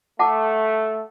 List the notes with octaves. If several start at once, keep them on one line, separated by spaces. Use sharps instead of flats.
A3 F#5 A5 D6